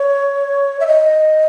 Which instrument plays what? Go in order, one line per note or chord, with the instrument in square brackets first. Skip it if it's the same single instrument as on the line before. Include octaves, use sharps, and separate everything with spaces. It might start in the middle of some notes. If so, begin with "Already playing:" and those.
Already playing: [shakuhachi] C#5
E5
D#5